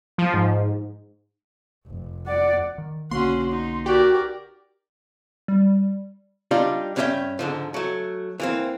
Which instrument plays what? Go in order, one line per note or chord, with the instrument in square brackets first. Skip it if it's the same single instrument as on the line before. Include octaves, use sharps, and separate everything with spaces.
[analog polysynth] F3
G#2
[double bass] F1
[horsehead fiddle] D5 F#5
[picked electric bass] D#3
[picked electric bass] B1 D3 A#3 [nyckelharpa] C#4 F#4 [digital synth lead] C6
[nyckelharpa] D#4
[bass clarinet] F#4 [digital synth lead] G4 [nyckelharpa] A#4 D5
[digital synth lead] G3
[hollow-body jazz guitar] G3 D4 D#4 F4 G4
G2 C#4 D4 A4 E5 G5
G#2 D3 F3
F#3 A3
E3 A#3 C4